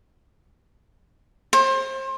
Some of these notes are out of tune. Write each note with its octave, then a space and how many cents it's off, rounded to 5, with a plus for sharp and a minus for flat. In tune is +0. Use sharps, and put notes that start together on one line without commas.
C5 +30